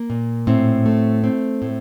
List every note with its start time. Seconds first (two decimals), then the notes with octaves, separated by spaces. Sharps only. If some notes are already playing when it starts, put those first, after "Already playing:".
Already playing: A#3
0.10 A#2
0.47 A2 C4
0.86 A3
1.24 C4
1.62 A2